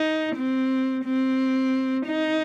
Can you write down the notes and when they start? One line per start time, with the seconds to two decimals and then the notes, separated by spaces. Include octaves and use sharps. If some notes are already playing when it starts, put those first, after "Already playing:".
Already playing: D#4
0.36 C4
1.05 C4
2.06 D#4